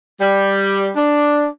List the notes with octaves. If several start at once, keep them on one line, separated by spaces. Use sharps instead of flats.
G3
D4